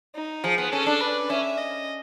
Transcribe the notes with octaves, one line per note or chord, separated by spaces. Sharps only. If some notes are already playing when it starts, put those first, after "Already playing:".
D#4
F3 G#4
B3
C#4 A4
D4
B4
C#4 E5
D#5